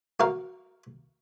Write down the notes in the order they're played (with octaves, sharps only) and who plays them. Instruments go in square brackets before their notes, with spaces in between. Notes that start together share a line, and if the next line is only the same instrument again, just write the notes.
[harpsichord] F#4 A#4 F5